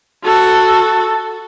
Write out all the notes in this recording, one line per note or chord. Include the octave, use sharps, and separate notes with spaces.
F#4 A4